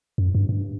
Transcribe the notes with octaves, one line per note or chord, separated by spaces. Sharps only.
F#2
G2
G2